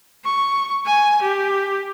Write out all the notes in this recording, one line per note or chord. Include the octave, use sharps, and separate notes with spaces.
C#6
G#5
G4